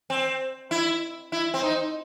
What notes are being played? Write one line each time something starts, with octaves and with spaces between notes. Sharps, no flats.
C4
E4
E4
C4
D#4